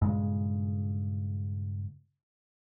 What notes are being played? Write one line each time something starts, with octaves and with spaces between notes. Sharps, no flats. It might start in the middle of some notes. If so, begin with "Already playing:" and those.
G2 A#2 C#3 G#3